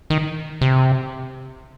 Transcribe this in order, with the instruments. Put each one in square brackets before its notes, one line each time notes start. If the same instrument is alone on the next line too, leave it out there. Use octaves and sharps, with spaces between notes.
[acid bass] D#3
C3